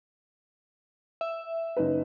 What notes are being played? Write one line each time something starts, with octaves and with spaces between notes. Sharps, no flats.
E5
F#1 D#4 B4